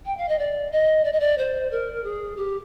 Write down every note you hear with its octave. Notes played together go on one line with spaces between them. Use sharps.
G5
F5
D#5
D5
D#5
D5
D#5
D5
C5
A#4
G#4
G4